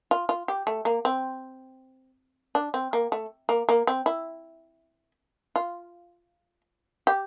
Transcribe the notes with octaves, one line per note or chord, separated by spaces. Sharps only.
F4
F4
G4
A3
A#3
C4
D4
C4
A#3
A3
A#3
A#3
C4
E4
F4
G4